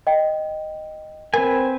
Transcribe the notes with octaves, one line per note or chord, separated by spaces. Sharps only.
D#5 G5
C4 A#4 B4 G#5